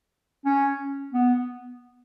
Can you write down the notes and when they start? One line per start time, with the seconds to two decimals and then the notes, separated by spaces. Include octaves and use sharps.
0.46 C#4
1.13 B3